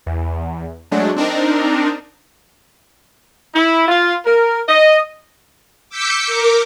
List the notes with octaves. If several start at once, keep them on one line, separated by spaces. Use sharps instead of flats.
E2
F#3 G#3 A3 D4
C4 D4 D#4 A#4
E4
F4
A#4
D#5
D6 E6 G6 B6 C#7
A#4 D6